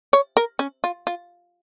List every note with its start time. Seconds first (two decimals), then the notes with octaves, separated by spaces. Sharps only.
0.13 C#5
0.37 A#4
0.59 C#4
0.84 F4
1.07 F4